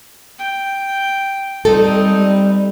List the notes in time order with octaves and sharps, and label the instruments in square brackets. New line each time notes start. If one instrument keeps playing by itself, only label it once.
[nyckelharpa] G5
[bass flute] G3 [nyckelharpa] C4 D#4 [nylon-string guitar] A4
[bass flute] G3